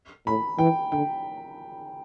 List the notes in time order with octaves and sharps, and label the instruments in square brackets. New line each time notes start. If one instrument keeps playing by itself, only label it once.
[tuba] A2 [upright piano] B5
[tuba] E3 [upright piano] G5
[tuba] D3 [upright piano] G5